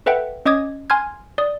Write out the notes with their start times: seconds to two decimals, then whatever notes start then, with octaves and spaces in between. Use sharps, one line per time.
0.06 A4 B4 E5 F#5 G5
0.45 C#4 D#5 D6 D#6 G#6
0.90 G#5 C6 F6 G#6
1.38 D5 D#6